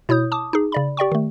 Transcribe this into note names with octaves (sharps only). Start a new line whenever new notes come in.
B2 E4 C#5 D#6 G6
A5 D6 D#6
D#4 G#4
C#3 D5 B5
G4 D5 G5 C#6
D#3 A3